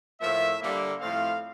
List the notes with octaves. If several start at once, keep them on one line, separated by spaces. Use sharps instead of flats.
A2 F3 A#3 E5
D3 G3 A#3
A2 F3 A3 C4 F5